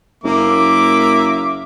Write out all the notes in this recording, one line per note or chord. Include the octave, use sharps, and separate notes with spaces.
F#1 A#3 E5 D6